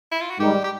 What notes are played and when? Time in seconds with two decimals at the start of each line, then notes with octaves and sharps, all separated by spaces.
0.12 E4
0.21 F4
0.30 F#4
0.39 G#2 D#3 G3 G4
0.64 G4